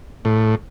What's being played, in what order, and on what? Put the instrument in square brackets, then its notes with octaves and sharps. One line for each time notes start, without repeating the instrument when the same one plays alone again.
[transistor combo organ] A2